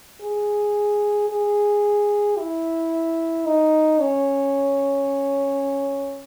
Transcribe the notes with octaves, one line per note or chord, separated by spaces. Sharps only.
G#4
G#4
E4
D#4
C#4